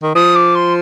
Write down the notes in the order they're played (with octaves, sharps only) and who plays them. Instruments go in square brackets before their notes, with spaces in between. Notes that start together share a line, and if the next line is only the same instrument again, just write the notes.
[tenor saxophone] D#3
[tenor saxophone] F3 [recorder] D#6
[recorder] D6
C6